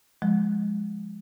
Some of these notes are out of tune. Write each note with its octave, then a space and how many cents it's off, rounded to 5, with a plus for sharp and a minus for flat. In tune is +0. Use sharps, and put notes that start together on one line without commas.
F3 +15 G#3 +0